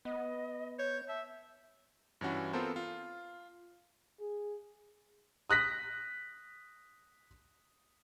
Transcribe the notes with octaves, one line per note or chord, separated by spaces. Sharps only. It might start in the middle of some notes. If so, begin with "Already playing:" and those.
B3 D#5
C#5 G6
E5 A5
G2 E3 C#4 F#4
B3 C4 F4 A4 A#4 C5
F4
G#4
D#6 F#6 A#6 B6